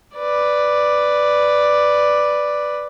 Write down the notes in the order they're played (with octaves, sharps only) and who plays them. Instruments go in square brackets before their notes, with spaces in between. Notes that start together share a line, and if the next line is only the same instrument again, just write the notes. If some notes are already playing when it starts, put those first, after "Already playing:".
[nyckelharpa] B4 D5